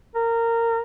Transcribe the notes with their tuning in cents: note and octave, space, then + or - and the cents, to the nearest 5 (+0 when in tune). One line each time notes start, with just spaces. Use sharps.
A#4 -15